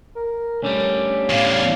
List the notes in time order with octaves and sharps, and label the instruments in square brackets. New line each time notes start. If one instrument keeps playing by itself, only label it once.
[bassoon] A#4
[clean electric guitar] D2 D3 G3 [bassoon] C#4
[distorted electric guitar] E2 A2 [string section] D5 F5